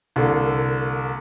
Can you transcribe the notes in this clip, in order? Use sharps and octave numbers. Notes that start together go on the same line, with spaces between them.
C2 D3 A#3